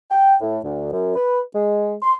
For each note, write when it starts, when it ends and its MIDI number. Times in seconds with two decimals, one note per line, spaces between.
0.10 0.35 79
0.41 0.59 45
0.63 0.90 38
0.91 1.14 42
1.15 1.39 71
1.54 1.93 56
2.02 2.14 84